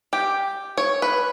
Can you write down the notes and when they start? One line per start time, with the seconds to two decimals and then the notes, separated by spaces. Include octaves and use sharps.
0.13 G4
0.77 C#5
1.02 B4